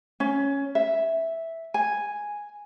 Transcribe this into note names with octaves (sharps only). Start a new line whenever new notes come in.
C#4
E5
G#5